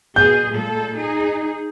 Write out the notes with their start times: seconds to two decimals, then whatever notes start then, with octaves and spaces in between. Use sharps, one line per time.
0.16 B2 G#4 G6
0.52 A#2 G#3 A4
0.94 D#4 G#4